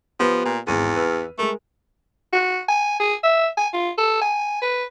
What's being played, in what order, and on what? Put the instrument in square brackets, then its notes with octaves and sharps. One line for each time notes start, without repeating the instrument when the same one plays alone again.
[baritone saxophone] F3 [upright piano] B3 G4 B4
[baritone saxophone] A#2
[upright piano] G#1 D#7 [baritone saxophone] E2
[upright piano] B4 E6 F6
[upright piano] G#3 A#4 [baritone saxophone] A3
[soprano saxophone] F#4
G#5
G#4
E5
G#5
F4
A4
G#5
B4